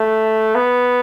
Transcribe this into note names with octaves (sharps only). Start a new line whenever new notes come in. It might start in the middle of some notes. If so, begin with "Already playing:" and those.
Already playing: A3
B3